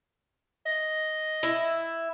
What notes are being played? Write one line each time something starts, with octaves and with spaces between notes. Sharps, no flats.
D#5
E4